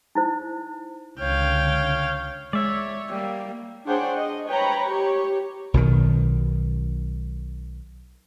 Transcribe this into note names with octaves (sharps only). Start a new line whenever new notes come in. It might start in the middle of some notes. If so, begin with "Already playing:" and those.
D#4 E4 C5
C#2 D3 C#5 F5 G5
G#3 C#5 D5 E5
G3 A#3
D4 G#4 C5 C#5 F#5 G5
D#5
B4 C#5 G5 A#5 B5
G4 C#5
B1 B2 D#3